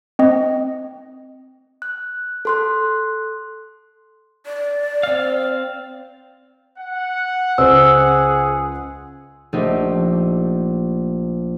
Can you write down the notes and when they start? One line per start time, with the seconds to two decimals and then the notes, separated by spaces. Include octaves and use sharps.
0.19 C4 D#5
1.82 F#6
2.45 A4 C6 F#6
4.46 D5
5.03 C4 F5
6.78 F#5
7.58 C#2 G#4 C5 E6
9.53 A#1 A3 D#4 G4